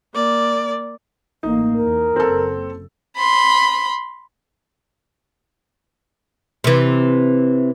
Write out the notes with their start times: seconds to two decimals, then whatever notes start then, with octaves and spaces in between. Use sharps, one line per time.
0.14 A#3 D5
1.43 A1 A#3 D#4
1.77 E2 A#4
2.16 F#1 C4 A4
3.16 B5 C6
6.64 C3 E3